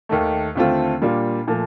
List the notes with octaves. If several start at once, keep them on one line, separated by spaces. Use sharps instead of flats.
D#2 D#3 A3
D#2 D3 A3 C4 F4
A#2 G3 A#3 D4 F4
A#2 F3 A3